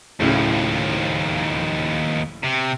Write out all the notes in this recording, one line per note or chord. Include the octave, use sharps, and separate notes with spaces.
D1 D#2 A2 C#3 F3
C3